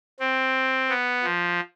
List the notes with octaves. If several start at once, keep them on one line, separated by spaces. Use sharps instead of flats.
C4
B3
F3